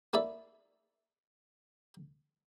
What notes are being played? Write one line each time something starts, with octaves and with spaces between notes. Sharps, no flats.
A#3 E4 A4 D5 E5